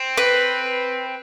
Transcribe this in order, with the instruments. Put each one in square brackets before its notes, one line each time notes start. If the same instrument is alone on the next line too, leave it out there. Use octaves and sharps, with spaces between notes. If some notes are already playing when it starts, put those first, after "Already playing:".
Already playing: [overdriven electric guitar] C4
[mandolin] B4